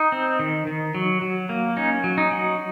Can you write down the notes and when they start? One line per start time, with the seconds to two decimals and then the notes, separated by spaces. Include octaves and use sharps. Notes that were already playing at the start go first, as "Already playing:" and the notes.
Already playing: D#4
0.12 C4
0.39 D#3
0.67 D#3
0.95 F#3
1.22 F#3
1.49 A#3
1.77 C#4 D#4
2.04 F#3
2.18 D#4
2.31 F#3